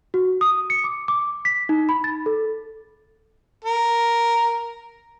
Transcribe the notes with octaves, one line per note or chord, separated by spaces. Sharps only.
F#4
D#6
C#7
D6
D6
B6
D#4
B5
A6
A4
A#4